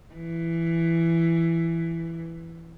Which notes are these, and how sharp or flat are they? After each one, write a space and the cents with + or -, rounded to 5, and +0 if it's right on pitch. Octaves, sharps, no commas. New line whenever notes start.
E3 +10